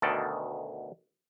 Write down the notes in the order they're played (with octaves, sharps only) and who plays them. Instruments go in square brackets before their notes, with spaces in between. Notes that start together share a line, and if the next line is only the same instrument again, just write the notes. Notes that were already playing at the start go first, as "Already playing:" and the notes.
[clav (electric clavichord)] D2 B2 D#3 A4 D5 A5